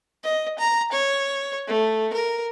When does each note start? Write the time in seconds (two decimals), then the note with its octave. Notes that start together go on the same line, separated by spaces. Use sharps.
0.24 D#5
0.59 A#5
0.92 C#5
1.68 A3
2.13 A#4